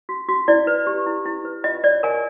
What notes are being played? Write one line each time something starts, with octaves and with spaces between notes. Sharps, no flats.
F#4
F#4
E4 D5
B4
G4
E4
E4
B4
F4 D#5
C#5 D5
A#4 G#5